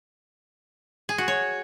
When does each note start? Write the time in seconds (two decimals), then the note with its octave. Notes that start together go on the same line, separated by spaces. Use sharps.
1.09 G#4
1.18 F#4
1.28 C#5